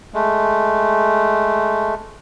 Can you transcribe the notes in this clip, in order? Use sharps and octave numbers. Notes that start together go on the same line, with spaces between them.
G#3 A3